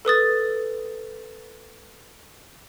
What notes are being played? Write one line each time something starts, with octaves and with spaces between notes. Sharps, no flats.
A4 B4 D#6 A6